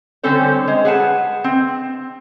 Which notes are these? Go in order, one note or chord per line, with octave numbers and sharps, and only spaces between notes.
D3 G3 C4 C#4 A4 C5
G#3
G#4 B4 F#5 A5
C4